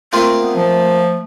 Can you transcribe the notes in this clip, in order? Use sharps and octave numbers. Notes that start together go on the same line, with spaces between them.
A3 A#3 C4 F4
B3
F3